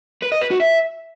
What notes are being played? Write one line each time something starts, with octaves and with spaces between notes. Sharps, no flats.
B4
D#5
B4
F#4
E5